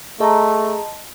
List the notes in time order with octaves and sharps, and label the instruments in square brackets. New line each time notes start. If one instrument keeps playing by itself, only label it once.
[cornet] A3 [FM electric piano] G#4 A#5 [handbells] D#5 A5 C6